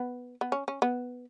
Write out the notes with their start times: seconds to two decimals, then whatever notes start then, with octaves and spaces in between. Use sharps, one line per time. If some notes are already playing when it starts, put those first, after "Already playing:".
Already playing: B3
0.41 B3
0.52 C#4
0.68 C#4
0.82 B3